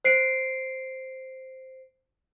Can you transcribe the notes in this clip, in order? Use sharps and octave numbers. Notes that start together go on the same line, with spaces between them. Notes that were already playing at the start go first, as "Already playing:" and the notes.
C5 C7 D7